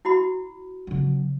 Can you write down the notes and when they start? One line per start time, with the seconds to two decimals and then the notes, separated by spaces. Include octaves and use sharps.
0.05 E4 F#4 B5
0.87 C#3 F#3